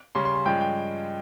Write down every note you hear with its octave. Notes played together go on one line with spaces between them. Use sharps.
C#3 G3 C#4 C6
C6
C6
G2 F3 G#3 C#4 G5
G5